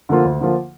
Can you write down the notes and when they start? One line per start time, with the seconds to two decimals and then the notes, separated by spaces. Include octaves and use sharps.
0.09 D3 F3 A#3 F4
0.25 D2
0.40 D3 F3 A#3 F4